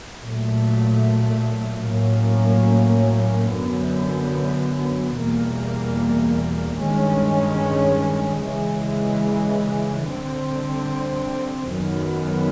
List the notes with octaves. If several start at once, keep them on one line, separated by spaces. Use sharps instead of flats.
A#2 F#3 A3
A2 F#3 A#3 C#4
F#2 D3 F#3 B3
E2 B2 G3 A#3
G2 D#3 G#3 C#4
C#3 E3 G#3
D3 G3 C4
F#2 D#3 F#3 B3